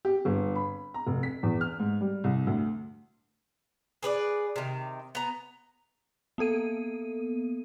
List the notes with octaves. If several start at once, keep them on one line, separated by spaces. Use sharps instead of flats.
G4
G1
B5
A#5
F1
B6
E2
F6
G#2
G3
C2
D2
G#4 B4 C#5 D5
C3 D#3
B3 A#5
A#3 B3 A4 D#7